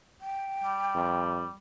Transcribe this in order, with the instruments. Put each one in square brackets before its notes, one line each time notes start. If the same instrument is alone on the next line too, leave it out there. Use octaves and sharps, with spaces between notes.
[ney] G5
[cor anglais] G3
[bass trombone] F2